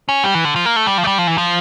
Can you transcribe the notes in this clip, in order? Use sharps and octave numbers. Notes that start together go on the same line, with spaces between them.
C#4
G3
E3
D3
F3
A#3
A3
G3
F3
A3
G3
F3
E3
F3